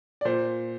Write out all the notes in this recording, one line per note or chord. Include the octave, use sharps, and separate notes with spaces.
D5
A#2 C5